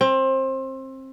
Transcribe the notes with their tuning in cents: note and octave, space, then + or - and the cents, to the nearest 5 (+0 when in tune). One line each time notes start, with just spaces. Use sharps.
C4 +25